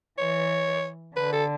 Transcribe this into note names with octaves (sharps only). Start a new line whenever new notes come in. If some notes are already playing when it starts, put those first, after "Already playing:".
E3 C#5
D3 B4
A4